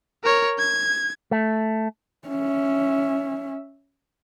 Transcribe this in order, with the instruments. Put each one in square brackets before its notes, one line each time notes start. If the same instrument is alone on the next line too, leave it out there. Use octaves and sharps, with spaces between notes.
[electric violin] A#4 C#5
G#6
[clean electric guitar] A3
[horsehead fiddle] C#4 E5